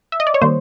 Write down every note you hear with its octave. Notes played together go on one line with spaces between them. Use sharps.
E5
D#5
D5
C#5
D#3 G3 A#3 C5